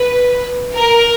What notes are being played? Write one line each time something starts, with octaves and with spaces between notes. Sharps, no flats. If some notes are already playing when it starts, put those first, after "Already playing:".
Already playing: B4
A#4